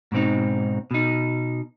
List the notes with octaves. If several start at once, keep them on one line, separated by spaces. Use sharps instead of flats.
G#2 B2 C4 D#4
B2 D#4